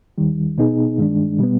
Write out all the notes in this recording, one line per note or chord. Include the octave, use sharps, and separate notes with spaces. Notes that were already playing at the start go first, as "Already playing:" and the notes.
D#2 D#3 G3
B2 B3 D#4 G#4
G2 D#3 G#3 D4
B2 G3 B3